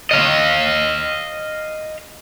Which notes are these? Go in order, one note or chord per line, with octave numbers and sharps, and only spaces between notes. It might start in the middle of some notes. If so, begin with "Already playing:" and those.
D#5 F5